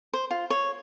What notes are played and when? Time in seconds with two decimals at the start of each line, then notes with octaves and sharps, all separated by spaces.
0.13 C5
0.31 F4
0.50 C#5